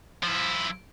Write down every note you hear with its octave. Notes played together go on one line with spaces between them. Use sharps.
F3 E4